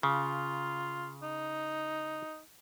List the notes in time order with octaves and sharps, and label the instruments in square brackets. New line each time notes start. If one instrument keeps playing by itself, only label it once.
[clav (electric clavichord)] C#3 [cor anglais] F4
[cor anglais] D#4